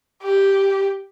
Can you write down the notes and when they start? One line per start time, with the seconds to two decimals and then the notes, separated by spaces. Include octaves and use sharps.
0.23 G4